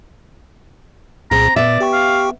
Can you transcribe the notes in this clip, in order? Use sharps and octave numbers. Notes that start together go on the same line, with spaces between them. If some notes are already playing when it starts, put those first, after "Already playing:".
C2 A#2 C4 G#4 A#5
A#2 B3 D5 E5
G4 G5 C#6
F5